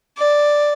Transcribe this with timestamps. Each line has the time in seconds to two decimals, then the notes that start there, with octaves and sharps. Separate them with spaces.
0.17 D5